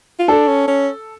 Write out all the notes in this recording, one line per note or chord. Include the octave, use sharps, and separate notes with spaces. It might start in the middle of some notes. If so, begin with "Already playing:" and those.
F4
D4 A4
C#4
C#4